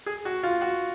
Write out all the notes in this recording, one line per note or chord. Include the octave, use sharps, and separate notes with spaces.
G#4
F#4
F4
F#4